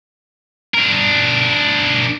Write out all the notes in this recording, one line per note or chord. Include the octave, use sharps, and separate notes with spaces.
D4 A#4